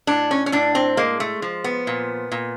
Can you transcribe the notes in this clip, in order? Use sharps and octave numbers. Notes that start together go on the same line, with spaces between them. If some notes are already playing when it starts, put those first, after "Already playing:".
A2 D4
C#4
C#4
A2 D4
C4
G#3 A#3
A3
F3
B3
A#2
A#2